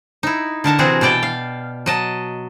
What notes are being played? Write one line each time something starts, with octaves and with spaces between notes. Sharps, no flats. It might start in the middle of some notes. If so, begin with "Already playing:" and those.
D#4 E4
D3 A#4 A5 A#5
C3 E3 C4 F#4 G#4
B2 E3 D5 G5
F5
F#3 D#5 A5